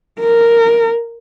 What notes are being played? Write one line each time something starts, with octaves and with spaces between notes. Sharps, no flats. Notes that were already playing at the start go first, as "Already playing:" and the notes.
A#4